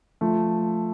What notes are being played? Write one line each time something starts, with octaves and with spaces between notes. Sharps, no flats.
F3 A3